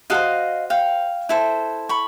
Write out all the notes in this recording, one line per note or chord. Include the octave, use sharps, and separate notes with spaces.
F#4 A4 C5 D#5 F5
F5 G5
E4 A4 C5
B5 C#6